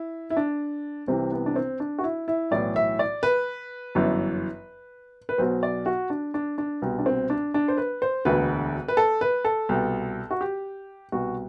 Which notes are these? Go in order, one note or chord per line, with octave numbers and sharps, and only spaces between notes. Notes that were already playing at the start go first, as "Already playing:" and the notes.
Already playing: E4
E4
D4
C2 C3 E3 C4
B3
D4
C4
D4
F#4
E4
E4
B1 A2 E3 D5
E5
D5
B4
G1 F#2 E3
B4
B1 B2 C5
D5
F#4
D4
D4
D4
C2 B2
D4
C4
D4
D4
C5
B4
C5
E1 D2 D3 B4
B4
A4
B4
A4
C2 B2
F#4
G4
C2 B2 F#4